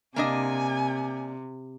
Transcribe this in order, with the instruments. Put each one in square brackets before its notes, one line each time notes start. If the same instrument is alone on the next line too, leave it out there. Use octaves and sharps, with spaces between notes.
[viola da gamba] C3 [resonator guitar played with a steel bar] A#3 D4 D#5 [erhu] G#5